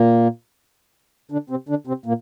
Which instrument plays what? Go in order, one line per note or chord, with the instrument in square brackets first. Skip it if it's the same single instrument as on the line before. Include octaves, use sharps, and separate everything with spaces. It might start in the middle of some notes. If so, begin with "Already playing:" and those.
Already playing: [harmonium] A#2 A#3
D3 D4
C3 C4
D3 D4
C3 C4
A#2 A#3